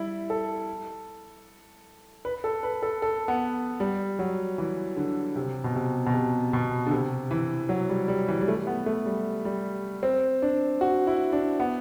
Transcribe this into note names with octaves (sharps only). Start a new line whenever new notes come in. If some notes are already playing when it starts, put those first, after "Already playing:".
Already playing: G3 E4
A4
B4
A4
B4
A4
A4
B3
G3
F#3
E3
D3
C3
B2
C3
B2
C3
B2
D3
C3
E3
F#3
G3
G3
E3
G3
A3
B3
A3
G3
G3
C4
D4
F#4
E4
D4
B3